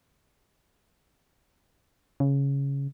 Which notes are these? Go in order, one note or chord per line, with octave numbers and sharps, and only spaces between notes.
C#3